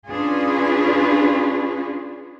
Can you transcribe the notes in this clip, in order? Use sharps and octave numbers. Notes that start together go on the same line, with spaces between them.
C#4 D4 F4 G#4 B4